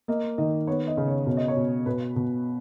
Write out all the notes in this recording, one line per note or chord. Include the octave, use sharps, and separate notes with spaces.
A#3 D#5
D#3 D#5
B3 C#5
D#5
C#3
C#5
B2 C#5
D#5
C#5
B2
B2 B4
B2